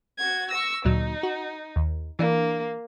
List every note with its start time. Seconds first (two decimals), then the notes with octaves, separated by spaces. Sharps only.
0.19 F#4 G#6
0.51 C#6 E6 A#6
0.85 D2 A#2 F#3 D#4
1.23 F#4
1.76 D#2
2.19 E3 A#3 D4